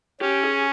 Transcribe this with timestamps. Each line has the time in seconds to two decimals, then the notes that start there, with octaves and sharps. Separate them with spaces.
0.21 C#4 G4
0.44 G#4